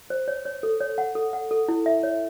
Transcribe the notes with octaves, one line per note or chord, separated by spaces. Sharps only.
C5
C#5
C#5
A4
C#5
F#5
A4
F#5
A4
E4
E5
C#5